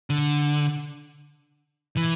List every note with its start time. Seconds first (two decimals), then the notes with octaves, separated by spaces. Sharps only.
0.10 D3
1.97 E3